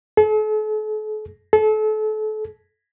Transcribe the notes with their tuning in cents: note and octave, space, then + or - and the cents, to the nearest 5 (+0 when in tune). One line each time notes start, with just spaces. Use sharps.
A4 -45
A4 -35